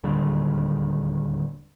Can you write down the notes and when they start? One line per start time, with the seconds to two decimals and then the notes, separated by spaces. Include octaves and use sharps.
0.03 D1 D#2 D3 G3